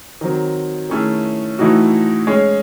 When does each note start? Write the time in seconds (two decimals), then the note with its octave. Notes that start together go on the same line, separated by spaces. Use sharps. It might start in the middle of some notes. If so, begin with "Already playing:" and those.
0.21 D#3 F#3 C4
0.90 D#3 A3 C#4 E4 G#4
1.59 A2 E3 A3 D#4 F#4
2.27 G#3 C#4 G#4 C#5